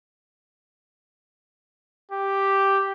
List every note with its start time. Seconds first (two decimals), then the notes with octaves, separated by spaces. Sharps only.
2.11 G4